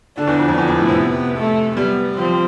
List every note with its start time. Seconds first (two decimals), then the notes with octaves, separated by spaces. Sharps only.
0.17 D3 D4
0.27 E2
0.38 F2
0.48 F2
0.58 E2 B3
0.68 F2
0.78 A2
0.88 C3
1.37 A3
1.77 G3 B3
2.17 F3 C4